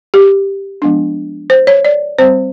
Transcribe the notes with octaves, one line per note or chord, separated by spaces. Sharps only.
G4
F3 G#3 B3 D4
C5
C#5
D5
G3 C4 C5